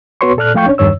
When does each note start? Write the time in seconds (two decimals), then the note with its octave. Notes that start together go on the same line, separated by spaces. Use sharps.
0.21 B3 F#4 B4 C#5 C6 C#6
0.37 A#2 A4 D5 F6 F#6
0.54 F3 A3 F5 G5 C#6 G6
0.66 C#4 D4 C#5
0.78 E2 G2 D#3 C#5 E6